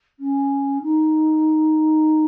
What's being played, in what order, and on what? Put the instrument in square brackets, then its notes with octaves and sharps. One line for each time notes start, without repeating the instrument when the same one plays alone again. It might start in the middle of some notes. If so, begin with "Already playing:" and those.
[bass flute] C#4
D#4